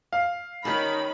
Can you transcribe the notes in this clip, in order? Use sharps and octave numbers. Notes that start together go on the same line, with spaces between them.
F5
D#3 C#4 G4 B5